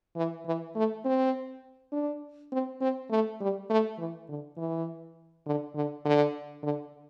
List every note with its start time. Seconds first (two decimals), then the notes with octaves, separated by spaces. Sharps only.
0.16 E3
0.46 E3
0.75 A3
1.05 C4
1.92 D4
2.52 C4
2.81 C4
3.10 A3
3.40 G3
3.70 A3
3.98 E3
4.29 D3
4.57 E3
5.46 D3
5.75 D3
6.05 D3
6.63 D3